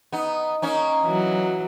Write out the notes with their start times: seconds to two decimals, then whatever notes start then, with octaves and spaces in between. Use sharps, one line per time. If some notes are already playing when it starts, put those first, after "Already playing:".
0.12 B3 D#4
0.62 A#3 C#4 D#4
1.03 E3 F#3